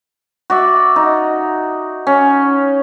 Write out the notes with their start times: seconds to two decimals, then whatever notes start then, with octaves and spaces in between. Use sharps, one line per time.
0.50 F#4 D5 E5
0.96 D#4
2.07 C#4